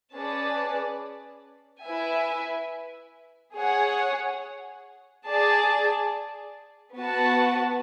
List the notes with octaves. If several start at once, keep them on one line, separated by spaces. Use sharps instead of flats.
C#4 G#4 B4 D5 A5
E4 B4 E5 G#5
G#4 C#5 F#5
G#4 D5 A5
B3 F#4 B4 F#5 A5